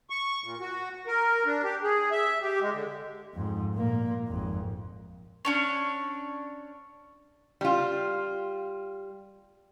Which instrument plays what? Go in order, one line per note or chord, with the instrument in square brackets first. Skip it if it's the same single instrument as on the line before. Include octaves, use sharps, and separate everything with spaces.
[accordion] C#6
A#2
F#4
A#4
D4
G4
G#4
E5
G4
G#3
D3
[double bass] F2 G#2
A#2 A#3
G#1 F2
[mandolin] C#4 D4 C#5
[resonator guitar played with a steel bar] G3 F4